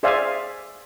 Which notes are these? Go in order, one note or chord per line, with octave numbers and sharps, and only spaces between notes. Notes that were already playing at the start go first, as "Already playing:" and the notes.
G#4 C5 D5 E5 F5 G#5